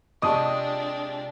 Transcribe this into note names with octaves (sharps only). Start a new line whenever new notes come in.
C3 G#3 D4 F4 D#5 A5 C#6 D#6